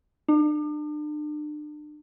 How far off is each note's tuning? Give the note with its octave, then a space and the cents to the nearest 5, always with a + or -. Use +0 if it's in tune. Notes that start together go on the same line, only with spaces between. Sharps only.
D4 +40